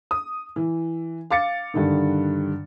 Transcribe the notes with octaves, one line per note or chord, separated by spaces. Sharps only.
D#6
E3
F5 D6 A6 C#7
G2 D3 D#3